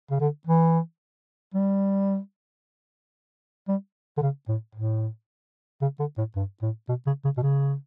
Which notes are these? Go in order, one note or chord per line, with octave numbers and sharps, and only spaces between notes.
C#3
D3
E3
G3
G3
D3
C#3
A2
A2
C#3
D3
A2
G2
A2
B2
C#3
C#3
B2
C#3